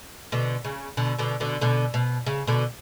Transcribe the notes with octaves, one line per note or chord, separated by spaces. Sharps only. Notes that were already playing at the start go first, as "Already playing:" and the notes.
B2 D3
C#3
B2 D3
B2 D3
B2 D3
B2 D3
B2
C#3
B2 D3